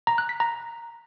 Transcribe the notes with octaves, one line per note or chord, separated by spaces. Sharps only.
A#5
F#6
B6
A#5